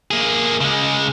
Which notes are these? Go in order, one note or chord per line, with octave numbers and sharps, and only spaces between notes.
A#3 G#4
C#3 G#3